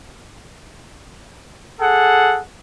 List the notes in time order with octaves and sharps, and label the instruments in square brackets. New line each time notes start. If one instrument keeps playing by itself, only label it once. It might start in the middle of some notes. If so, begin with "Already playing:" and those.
[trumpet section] G#4 A4 F#5